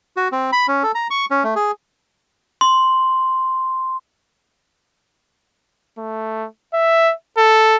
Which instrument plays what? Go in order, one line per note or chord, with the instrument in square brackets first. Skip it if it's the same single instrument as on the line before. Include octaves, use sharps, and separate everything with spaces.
[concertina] F#4
C4
B5
C#4
A4
A#5
C#6
C#4
A3
G#4
[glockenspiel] C6
[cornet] A3
E5
A4